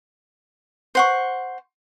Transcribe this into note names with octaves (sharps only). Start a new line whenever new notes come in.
C5 F#5 C#6